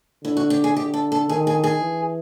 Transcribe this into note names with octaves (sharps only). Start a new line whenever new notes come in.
D3 E4
F#4
G4
G#4
D3 G4
A4
A4
D#3 G#4
G#4
G#4
E3